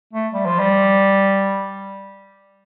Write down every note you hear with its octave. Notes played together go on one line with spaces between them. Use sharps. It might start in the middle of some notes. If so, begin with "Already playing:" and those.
A3
G3
F3
G3